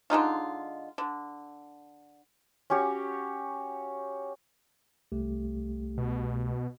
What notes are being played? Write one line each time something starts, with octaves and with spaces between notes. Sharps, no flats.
D3 G#3 D#4 F4
D3
C#4 F#4 G4 C#5
C2 A3 G4
B2